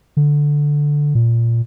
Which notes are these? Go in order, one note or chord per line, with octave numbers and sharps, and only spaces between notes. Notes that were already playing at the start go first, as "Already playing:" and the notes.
D3
A#2